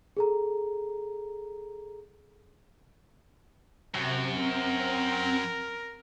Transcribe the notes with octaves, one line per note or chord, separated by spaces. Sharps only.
G#4 A4 A#5
F#2 C3 F#4
C4 A#4